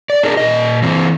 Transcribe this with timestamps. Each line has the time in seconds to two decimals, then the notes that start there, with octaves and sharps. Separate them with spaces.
0.10 D5
0.23 D4 D#4 G#4 A#4 D5
0.37 A#2 D#5
0.83 E3 C4